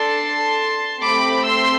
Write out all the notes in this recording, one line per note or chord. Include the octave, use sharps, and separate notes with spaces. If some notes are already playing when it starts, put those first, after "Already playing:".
Already playing: D4 A4 A5 C6
A3 C4 G4 B5 D6
C6 E6